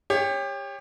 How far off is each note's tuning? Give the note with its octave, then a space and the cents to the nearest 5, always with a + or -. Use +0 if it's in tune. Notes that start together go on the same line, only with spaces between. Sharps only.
G4 +30 C#5 -5